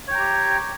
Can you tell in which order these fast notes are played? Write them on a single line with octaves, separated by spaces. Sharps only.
C#5 G5 A#5 G4